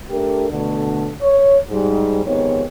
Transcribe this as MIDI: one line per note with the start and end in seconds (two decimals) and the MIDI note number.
0.10 0.48 57
0.10 0.48 62
0.10 0.48 67
0.10 0.48 69
0.10 0.48 70
0.51 1.11 47
0.51 1.11 50
0.51 1.11 57
1.21 1.58 73
1.71 2.23 44
1.71 2.23 55
2.25 2.63 41
2.25 2.63 44
2.25 2.63 51
2.25 2.63 59
2.25 2.63 67
2.25 2.63 73